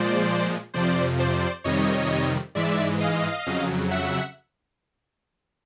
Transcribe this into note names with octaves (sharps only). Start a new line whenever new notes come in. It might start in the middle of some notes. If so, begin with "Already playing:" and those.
Already playing: A#2 F3 G#3 C5 D5
F2 C3 F3 C5 D5
C5 D5
F2 C3 D#3 G3 C#5 D#5
G#2 E3 G#3 D5 E5
D#5 F5
F2 C#3 F#3
E5 F#5